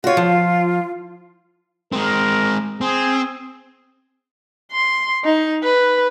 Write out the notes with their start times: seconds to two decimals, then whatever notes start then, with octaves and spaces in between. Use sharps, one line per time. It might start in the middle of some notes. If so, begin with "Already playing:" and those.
0.04 F4 F#4 C#5
0.17 F3
1.92 G#3 C4 A#4
2.81 C4 G#4
4.72 C6
5.24 D#4
5.63 B4